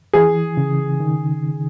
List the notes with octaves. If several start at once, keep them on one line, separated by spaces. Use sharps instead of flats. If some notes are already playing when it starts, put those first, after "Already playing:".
E3 G#4
C#3
D#3